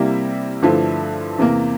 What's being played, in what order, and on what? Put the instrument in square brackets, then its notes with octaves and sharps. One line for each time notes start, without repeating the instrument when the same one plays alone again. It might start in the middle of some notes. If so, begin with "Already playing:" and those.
Already playing: [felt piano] C3 G3 A#3 E4
G2 D3 F3 A3 E4
E2 C3 E3 A#3